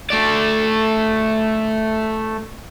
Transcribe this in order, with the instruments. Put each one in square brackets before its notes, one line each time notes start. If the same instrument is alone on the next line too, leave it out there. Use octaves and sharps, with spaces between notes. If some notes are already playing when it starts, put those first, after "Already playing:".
[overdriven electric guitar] A3 D5